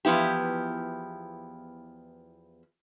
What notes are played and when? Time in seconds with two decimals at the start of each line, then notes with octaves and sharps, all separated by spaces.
0.05 E2 F3 B3 E4 G4